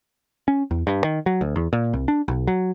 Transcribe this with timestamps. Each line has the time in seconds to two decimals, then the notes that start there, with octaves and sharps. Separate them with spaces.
0.48 C#4
0.71 E2
0.87 G2
1.04 D#3
1.26 F#3
1.41 D2
1.56 E2
1.73 A#2
1.93 C2
2.08 D4
2.28 B1
2.47 F#3